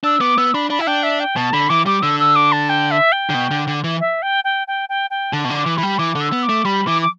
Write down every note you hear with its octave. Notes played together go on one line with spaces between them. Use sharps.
D4 E6
B3 D6
B3 E6
D4 B5
D4 B5
E4 E5
D4 G5
E5
G5
B2 A5
D3 B5
E3 D6
G3 D6
D3 E6
E6
D6
A5
G5
E5
G5
D3
B2
D3
D3
E3
E5
G5
G5
G5
G5
G5
D3 A5
B2
D3 D6
E3
E3 B5
G3
E3 D6
D3
E6
B3
D6
A3
G3 B5
E3 D6
D6